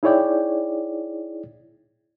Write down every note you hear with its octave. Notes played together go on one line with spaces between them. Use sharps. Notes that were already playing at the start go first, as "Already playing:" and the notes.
D#4 E4 G#4 C#5 D5 G5